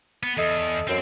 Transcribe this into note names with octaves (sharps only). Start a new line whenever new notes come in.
B3
E2 A4 D#5
F#2 C4